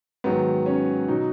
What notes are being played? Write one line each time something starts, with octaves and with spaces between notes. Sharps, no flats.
G#2 D#3 F#3 B3
C#4
B2 F#3 D#4